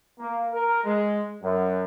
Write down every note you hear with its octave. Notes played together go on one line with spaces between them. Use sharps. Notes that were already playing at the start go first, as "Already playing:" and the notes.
A#3
A#4
G#3
F#2